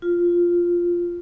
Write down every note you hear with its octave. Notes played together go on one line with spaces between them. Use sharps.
F4